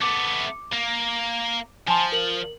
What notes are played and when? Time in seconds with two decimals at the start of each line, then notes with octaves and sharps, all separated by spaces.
0.02 A3 B3 D6
0.72 A#3
1.88 F3 G#5 A5 C6
2.12 A#4 F#7